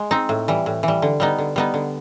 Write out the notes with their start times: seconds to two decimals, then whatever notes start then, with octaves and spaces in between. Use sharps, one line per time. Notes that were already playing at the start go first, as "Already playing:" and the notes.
Already playing: G#3
0.11 C4 D#4
0.29 A2
0.48 E3 G3
0.66 A2
0.83 E3
0.88 G3
1.02 D3
1.20 G3 B3 D#4
1.38 D3
1.56 G3 B3 D#4
1.74 D3